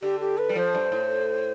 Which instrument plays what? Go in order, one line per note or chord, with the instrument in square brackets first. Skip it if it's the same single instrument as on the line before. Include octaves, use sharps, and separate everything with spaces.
[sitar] D3 [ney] G4
[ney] G4
B4
[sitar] G3
[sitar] F3 [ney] C5
[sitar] G2
A2